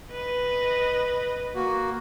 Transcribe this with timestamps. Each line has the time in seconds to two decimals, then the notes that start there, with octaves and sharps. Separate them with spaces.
0.12 B4 D#5
1.55 A#3 F#4